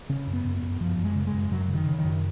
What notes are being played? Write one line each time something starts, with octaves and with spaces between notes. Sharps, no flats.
C#3 C#4
F#2
B3
F#2
B3
F#2
F#2 F3
F#2
G#3
C#3
G#3
F#2
F#2 F#3
C#3
D#3
C#3
D#3
F#2